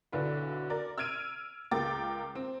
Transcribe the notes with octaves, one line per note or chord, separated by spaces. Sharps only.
B1 D3 D4 E4 B4
A#4 D5
E6 F6 G#6 D7 D#7
C#2 G#4 A#4 G5 D6 A6
C4